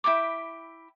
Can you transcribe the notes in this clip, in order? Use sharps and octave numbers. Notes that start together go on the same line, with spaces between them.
E4 G5 B5 D6